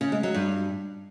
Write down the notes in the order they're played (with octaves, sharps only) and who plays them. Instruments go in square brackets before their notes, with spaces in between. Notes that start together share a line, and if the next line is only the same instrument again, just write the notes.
[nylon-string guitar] C#3
G#3
F#3
G2